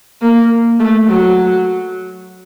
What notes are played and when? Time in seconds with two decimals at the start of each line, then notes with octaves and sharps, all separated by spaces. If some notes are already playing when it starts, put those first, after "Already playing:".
0.22 A#3
0.79 A3
1.08 F#3